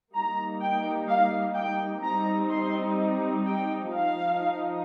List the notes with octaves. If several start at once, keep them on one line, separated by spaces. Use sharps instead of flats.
G3 A#3 D#4 A#5
G5
F5
G5
G3 C4 D#4 A#5
C6
G5
F3 D#4 F5